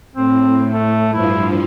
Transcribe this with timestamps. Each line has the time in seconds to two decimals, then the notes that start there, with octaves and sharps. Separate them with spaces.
0.16 A2 C4
0.73 A3
1.13 G2 F3 E4